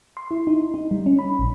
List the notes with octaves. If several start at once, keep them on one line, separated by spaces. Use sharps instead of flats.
C6
E4
D#4
D#4
G3
C#4
B5
A#1